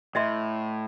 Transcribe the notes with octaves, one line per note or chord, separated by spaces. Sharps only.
A2 D#5 E5 C6